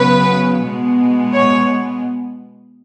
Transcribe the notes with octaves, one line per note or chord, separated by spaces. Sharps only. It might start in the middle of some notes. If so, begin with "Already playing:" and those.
Already playing: C#3 F#3 B3 B4
B2 G#3 B3
C#5